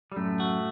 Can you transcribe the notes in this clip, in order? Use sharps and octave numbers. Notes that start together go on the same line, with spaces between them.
G3
F#2 A2 A3
F#4